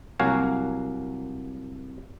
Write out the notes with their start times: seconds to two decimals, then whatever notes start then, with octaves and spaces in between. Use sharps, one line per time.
0.20 C2 F#3 A#3 F#4 F5 G#5